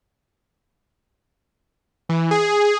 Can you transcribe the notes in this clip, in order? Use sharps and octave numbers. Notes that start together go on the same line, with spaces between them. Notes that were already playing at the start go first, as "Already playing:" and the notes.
E3
G#4